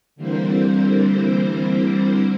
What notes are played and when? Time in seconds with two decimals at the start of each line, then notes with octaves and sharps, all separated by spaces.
0.16 D3 E3 G3 A#3 C4 C5